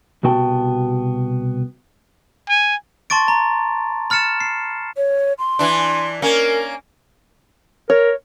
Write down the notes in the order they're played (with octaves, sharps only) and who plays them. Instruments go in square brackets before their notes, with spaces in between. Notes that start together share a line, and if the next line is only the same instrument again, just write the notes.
[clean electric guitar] C2 B2 B3 F#4 G5 A5
[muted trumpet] G#5
[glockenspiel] A5 C6 C#6 A6 D7
A#5
B5 F6 A6 C#7 E7
C7
[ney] C#5
C6
[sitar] E3 D4
[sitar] A#3 C#4 [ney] A#4
[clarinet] A#4 [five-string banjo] C#5